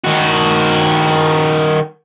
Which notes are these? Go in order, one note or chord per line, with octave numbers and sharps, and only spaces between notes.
D#3 F#4